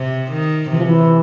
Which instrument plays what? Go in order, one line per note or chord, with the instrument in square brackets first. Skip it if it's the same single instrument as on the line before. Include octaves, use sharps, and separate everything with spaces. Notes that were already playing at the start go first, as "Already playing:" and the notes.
Already playing: [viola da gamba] C3
D#3
[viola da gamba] C3 [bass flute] E3
[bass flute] F3
E3